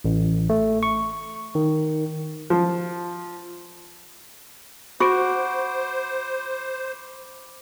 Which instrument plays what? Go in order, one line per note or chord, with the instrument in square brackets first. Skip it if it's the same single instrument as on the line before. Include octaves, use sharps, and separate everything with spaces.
[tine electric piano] A1
A3
C#6
D#3
[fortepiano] F3
[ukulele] F#4 [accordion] C5 [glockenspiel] B5 D6 D7